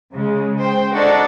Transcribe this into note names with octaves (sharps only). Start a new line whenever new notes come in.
C#3 G#3
C5 G5
D4 D#4 F#4 A4 D5